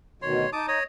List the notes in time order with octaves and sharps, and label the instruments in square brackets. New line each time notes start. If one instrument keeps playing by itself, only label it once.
[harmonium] D2 B2 D#3 [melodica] C#5 C6
[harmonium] D#4 [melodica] A5 D6 D#6
[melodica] C#5 D#5 D#6